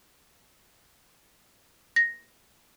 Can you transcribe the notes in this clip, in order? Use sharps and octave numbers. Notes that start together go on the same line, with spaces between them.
A#6